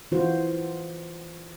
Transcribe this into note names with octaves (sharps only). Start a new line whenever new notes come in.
E3 F4 F#4 C5